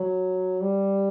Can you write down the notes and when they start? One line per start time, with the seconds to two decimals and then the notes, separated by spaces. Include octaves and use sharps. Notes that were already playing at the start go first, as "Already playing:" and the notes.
Already playing: F#3
0.61 G3